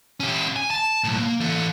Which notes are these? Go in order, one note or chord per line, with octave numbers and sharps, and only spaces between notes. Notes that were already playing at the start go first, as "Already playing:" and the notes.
C#4 G4
G#5
A5
B1 A2
A#3
E3 A4